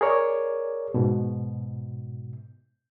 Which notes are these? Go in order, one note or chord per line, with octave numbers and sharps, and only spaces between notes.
G#4 A#4 C#5 D5
G#2 B2